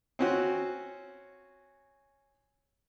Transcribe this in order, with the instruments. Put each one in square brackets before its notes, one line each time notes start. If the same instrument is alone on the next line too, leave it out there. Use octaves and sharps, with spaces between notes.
[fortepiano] C4 C#4 F#4